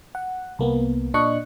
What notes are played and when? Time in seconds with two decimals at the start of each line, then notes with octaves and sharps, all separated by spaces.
0.15 F#5
0.59 C2 A#3 B3
1.14 A#2 D4 D#5 C#6 F#6